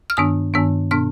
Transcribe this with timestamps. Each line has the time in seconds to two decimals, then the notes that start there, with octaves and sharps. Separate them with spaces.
0.10 F6
0.17 G2 D#3 B3 D4 D#6
0.54 G2 D#3 B3 D4
0.91 B2 B3 D4 F6